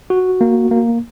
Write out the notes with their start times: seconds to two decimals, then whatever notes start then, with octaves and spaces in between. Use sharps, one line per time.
0.10 F#4
0.41 A#3
0.71 A#3